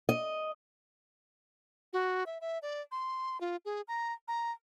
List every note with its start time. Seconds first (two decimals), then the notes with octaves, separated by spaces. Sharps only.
0.09 D#5
1.93 F#4
2.26 E5
2.41 E5
2.62 D5
2.92 C6
3.41 F4
3.65 G#4
3.88 A#5
4.28 A#5